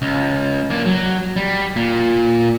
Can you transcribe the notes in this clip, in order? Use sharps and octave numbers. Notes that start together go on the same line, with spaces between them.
C#2
A#3 D4
F#3
G3
A#2